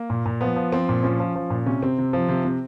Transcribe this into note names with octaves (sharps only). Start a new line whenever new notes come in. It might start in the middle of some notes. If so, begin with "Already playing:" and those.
Already playing: A#3
A#2
A#2
F3 B3
F3
F3 C4
A#2
F3 C#4
F3
F3
A#2
C3 C#4
C3 C4
C3
F3
C3
C3